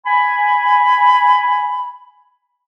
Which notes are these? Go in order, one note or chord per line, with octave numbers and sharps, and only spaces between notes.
G#5 B5